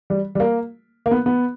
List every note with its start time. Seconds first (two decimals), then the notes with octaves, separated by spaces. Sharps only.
0.10 G3
0.35 G3
0.40 A#3
1.06 A#3
1.11 B3
1.26 B3